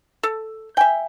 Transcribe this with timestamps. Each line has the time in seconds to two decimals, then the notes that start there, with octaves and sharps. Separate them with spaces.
0.23 A4
0.77 E5 G5 G#5